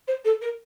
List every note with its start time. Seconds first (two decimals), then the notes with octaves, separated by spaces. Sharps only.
0.08 C5
0.25 A4
0.42 A#4